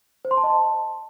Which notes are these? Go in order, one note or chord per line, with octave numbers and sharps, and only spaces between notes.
C5
C6
A5
D#5
A5